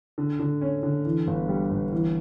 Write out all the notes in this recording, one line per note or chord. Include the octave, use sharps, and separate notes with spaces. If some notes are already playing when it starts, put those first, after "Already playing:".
D3
D3
C#4
D3
E3
G1
G3
G1
E3